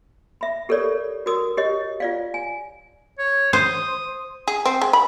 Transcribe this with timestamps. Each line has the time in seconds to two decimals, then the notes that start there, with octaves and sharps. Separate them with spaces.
0.41 E5 B5
0.69 G4 A4 A#4 C#5 D5
1.26 F#4 A#4 D#6
1.57 G4 C#5 D#5
2.00 F4 D5 F5
2.34 G#5
3.19 C#5
3.53 C5 D#6
4.48 G#4
4.66 C4
4.82 G#3
4.93 B5